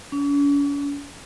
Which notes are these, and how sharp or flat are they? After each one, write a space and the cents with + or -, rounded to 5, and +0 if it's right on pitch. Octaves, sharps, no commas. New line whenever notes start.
C#4 +45